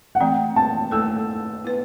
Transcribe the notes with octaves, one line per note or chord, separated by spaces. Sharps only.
F#5
E3 A3 C4 G5
A5
A3 E4 A4 E6
B3 E4 B4